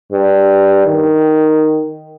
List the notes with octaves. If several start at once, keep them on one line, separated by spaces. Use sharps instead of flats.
G2
D#3